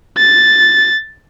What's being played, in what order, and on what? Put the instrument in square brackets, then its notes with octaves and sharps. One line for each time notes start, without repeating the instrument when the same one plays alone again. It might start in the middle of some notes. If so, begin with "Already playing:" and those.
[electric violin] A6